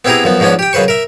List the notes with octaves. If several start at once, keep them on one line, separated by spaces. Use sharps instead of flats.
B3 C4 E4 G4 G#4 A#5
F#2 F3 B3
G#2 F3 B3 C#4 D4
G4 G5
F#2 C#3 B4 C5 C#6
A#4 E5